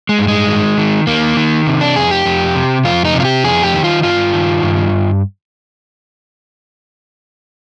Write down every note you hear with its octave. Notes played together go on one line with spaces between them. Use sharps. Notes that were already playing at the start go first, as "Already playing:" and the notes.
G#3
G2
G#3
D#3
D#3
D#3 A#3
D#3
C3
D4
F2 G#4
G4
F2
C3
F2 F4
D#4
C3
F4
G4
F2 G#4
G4
D#3
F4
G2 F4
D#3
G2